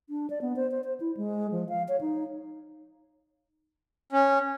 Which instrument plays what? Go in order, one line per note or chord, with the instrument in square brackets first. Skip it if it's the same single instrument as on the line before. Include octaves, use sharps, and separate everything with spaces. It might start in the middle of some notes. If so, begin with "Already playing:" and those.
[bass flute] D4
D5
B3
C5
C5
C5
E4
G#3
F3
F5
C#5
D#4
[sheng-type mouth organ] C#4